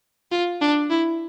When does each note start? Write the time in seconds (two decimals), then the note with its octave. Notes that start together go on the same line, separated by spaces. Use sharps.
0.32 F4
0.61 D4
0.90 E4